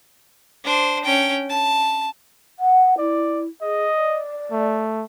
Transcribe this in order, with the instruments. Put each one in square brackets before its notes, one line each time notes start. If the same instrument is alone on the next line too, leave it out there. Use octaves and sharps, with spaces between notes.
[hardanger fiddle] D4 C5
C#4 G5
A5
[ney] F#5
[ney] E4 [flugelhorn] D5
[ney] G#4 [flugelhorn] D#5
[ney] D5
[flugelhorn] A3